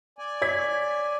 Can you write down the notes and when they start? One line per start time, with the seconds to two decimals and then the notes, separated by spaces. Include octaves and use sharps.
0.18 D5 G#5
0.42 C#5 G#6 B6